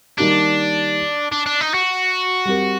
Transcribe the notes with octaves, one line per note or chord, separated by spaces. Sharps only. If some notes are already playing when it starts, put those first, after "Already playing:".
D#3 G3 A#3 D4 D#4 G4
D4
D4
D#4
F#4
G3 C4 G4 A#4